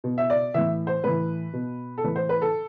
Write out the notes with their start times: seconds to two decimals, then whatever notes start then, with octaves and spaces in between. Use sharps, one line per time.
0.04 B2
0.18 E5
0.30 D5
0.54 A2 E3 E5
0.87 C5
1.04 A2 E3 B4
1.53 B2
1.98 A4
2.04 A2 E3 B4
2.16 C5
2.29 B4
2.42 A4